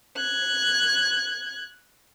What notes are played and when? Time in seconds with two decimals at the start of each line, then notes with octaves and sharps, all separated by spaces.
0.17 F#6 G#6